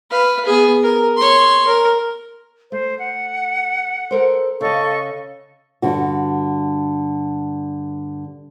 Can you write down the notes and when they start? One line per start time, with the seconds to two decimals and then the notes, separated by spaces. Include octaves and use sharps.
0.11 B4 F5
0.45 B3 G#4
0.83 A#4
1.17 C#5 C6
1.67 A#4
2.72 A3 C5
2.99 F#5
4.11 A4 A#4 C5
4.61 C#3 A4 D#5 F5 C#6
5.82 G2 D3 F#4